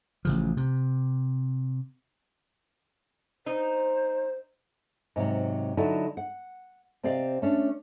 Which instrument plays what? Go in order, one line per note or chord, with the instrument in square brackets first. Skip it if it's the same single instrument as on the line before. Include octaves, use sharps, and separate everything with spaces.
[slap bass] A1 C#3 F3
C3
[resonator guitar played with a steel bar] D#4 [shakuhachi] C5
[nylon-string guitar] G#2 C3 D#3 F#3
D3 F#3 D#4 E4 F#4 A4
F#5
C3 C4 G4 D5 D#5 F5
A3 C#4 D4